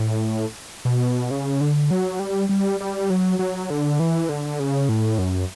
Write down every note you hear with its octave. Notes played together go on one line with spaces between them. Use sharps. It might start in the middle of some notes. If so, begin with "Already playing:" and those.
Already playing: A2
B2
C#3
D3
F#3
G3
G3
G3
F#3
F#3
D3
E3
D3
C#3
A2
F#2